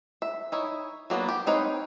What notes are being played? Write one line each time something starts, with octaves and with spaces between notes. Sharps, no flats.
E5
D#4 E4 C#5
F#3 A#3 B3 D4
G4
C4 D#4 B4 C#5 F5